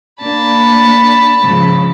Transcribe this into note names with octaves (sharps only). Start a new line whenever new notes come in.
A#3 D4 A5 B5
G#2 C#3 F3